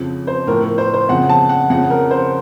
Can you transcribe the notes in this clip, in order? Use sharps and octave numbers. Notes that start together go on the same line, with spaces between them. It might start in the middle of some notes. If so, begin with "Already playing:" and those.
Already playing: F2 C#3 F3
C5
A2 F3 A#4
A#4
C5
C5
F2 C#3 F3 F#5
A5
F#5
F2 C#3 F3 F#5
A#4
C5